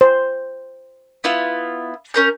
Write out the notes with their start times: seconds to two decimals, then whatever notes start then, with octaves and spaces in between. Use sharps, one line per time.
0.01 C5
1.24 B3 E4 F4
2.14 C#4 A#4 G6